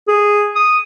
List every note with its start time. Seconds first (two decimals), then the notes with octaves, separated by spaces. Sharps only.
0.08 G#4
0.56 D#6